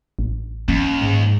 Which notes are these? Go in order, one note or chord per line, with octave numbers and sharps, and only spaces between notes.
A1
D#2 C#4
G#2